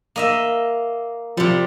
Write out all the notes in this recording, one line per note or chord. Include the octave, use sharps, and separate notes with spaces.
A#3 D#5 E5
C3 F3 G3